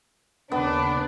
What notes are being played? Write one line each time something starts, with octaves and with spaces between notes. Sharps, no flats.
D#2 C#3 B3 D4